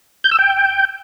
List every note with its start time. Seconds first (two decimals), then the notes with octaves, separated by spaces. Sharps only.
0.24 G6
0.31 E6
0.39 G5